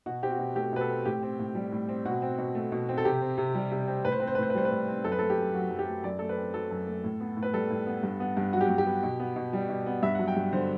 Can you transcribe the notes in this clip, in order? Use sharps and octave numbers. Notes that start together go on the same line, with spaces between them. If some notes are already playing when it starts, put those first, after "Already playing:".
B2 F#4
C4 G4
F#4
B2
A3 G4
B2 B4
A4
C4
A2 G4
C4
A2
G3
A2
C4
B2 F#4
C4
B2
A3
B2
C4
A4
C3 G4
C4
C3
G3
C3
C4
A2 B4
C5
C4 B4
C5
B4
A2 C5
B4
G3 C5
B4
A2
C4
F#2 A4
B4
A4
A3
G4
F#2
F#3 F#4
F#2
G4
A3
F#2 D5
A3 A4
B4
C4
F#3 A4
F#2
A3
A2
B3
A2
B4
G3 A4
A2
B3
G2
B3
G2
F#3 F#4
G4
G2 F#4
G4
B3
B2
B3
B2
G3
B2
B3
G2 E5
F#5
F#3
G5
G2
D3 C5